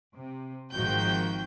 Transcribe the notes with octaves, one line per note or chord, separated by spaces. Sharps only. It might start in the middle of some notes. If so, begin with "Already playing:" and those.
C3
G#1 D#3 F3 F#4 G5 G6